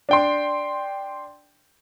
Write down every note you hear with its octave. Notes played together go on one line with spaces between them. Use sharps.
D4 G5 C6